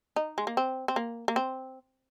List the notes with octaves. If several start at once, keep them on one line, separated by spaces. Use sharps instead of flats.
D#4
G#3
A#3
C4
C4
A#3
A#3
C4